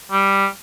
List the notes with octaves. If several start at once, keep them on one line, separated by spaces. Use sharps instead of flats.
G3